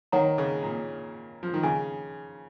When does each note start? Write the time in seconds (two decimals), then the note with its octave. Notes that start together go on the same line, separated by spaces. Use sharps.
0.12 D#3 C#5 F#5 A#5
0.38 C#3
0.63 A#2
1.43 F3
1.54 D#3
1.63 C#3 G#5